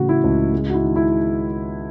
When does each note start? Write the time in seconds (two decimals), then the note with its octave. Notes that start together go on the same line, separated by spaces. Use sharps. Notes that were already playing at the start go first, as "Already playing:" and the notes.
Already playing: A2 C#3 E3 F#4
0.09 E4
0.24 C#2
0.53 G#3
0.70 F#4
0.74 E4
0.82 D#3
0.96 E4